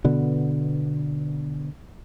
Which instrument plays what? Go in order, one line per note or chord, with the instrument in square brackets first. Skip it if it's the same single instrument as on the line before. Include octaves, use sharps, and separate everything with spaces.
[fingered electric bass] B2 D3 B3